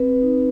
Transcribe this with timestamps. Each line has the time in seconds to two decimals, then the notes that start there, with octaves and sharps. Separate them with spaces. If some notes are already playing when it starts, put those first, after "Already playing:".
Already playing: C4 B4
0.22 D#4